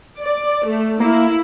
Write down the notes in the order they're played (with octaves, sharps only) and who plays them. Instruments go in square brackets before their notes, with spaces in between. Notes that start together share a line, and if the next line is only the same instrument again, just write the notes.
[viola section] D5
A3
[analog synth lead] A#3 [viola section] E4